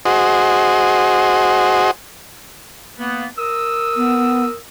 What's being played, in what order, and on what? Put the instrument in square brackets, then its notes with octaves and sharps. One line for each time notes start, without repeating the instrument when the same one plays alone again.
[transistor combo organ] F#4 G#4 C5 D#5
[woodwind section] A#3 B3
A#4 D#6 E6
[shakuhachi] B3